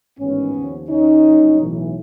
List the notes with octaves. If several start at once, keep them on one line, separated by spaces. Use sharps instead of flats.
A1 G#2 D#3 B3 C#4
D#2 C#3 F3
D#2 D#3 C#4 D#4
G1 F#2 C#3
B1 A2 E3